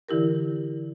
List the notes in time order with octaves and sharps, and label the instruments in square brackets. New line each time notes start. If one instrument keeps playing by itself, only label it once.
[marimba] D3 E3 E4 G4 A#4